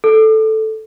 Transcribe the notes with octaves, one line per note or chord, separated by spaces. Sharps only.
A4